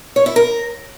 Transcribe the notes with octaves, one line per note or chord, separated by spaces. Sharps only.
C#5
E4
A#4